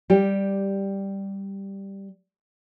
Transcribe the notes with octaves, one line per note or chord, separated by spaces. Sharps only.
G3 G4